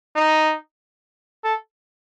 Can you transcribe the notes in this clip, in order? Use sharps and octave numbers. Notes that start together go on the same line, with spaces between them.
D#4
A4